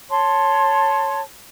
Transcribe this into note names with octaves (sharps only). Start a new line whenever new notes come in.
C#5 A5 C6